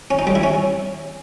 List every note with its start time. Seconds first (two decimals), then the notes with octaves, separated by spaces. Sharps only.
0.11 C#4
0.19 D#4
0.27 G3
0.35 E4
0.43 C#4